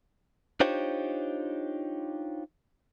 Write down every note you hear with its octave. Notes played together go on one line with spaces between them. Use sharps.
D4 D#4 F4 G4 C5 C#5